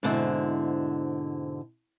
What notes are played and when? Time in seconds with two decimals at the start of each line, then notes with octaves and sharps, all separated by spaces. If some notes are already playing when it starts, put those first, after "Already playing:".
0.03 G#2 B2 D3 C4 E4